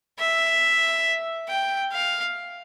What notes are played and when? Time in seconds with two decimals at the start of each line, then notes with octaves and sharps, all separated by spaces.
0.19 E5
1.49 G5
1.92 F5